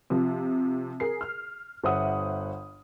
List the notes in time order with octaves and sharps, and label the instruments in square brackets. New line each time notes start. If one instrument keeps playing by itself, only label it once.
[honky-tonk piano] C3 F3
G#4 A#4 C7
F6
G1 C5 E5 F#5 D#6